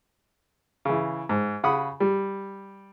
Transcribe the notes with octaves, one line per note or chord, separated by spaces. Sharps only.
C#3 E3
G#2
C#3 F#5 B5 D#6
G3